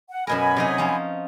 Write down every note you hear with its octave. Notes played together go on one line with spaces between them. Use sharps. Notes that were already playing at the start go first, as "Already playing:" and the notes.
F#5
F#2 B2 A#4 G#5 B5
C3 F#3 D#4
F3 C#4